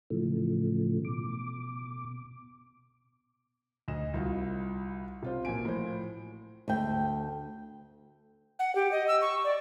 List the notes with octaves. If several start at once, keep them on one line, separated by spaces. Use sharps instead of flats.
A2 C#3 E3 F3 A3
B2 D6
D2 D#5 E7
C2 F4 F#4
C3 F4 C5
A1 A#2 F#4 G#5 D7
A2 F3 C5
D2 G5
F#5
G4
D#5
E6
C#6
D5